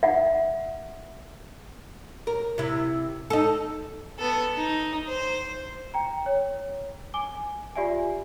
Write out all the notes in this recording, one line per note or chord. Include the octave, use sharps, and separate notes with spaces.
E5 F#5
A#4
C3 E4
D#4 A4
B3 A4
D#4
C5
G5 A#5
C#5
G#5 D6 G7
F4 G4 D5 E5 G#5